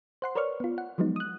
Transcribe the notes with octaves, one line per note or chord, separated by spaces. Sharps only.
C5 F#5 C6
A#4 B4 C#5 D5 C#6 F6
B3 F4
F#5
F3 F#3 G#3 B3 D#4
D#6 F#6